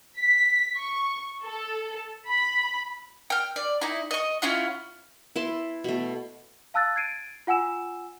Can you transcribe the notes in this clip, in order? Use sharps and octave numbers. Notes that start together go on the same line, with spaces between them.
B6
C#6
A4
B5
G5 F6
D5
D#4 E4
D#5 C#6
C#4 E4 F4 F#5
E4 B4 A5 C6
B2 A3
F5 A5 E6 F#6 A6
G#6 A6 C7 D7 D#7
F4 F#5 G#5 E6 E7